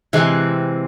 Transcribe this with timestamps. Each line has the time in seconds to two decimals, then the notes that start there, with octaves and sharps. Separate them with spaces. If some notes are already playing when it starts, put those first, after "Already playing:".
0.13 C3 E3 G#3 C4